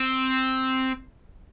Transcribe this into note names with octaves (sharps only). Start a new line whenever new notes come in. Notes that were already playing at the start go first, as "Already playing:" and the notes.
Already playing: C4